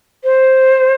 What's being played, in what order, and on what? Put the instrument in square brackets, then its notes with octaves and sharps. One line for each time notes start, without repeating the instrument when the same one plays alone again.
[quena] C5